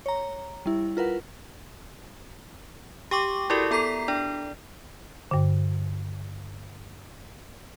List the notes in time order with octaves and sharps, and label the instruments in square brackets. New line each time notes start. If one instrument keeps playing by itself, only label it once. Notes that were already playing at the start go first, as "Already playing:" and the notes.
[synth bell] C#5 A#5
G3 E4
F4 A#4 B4 F#5
G4 G5 C#6 D6
E4 F#4 G4 A4 A#4 D5
B3 A4 A#5 B6 C7
D4 D5
[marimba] G2 D3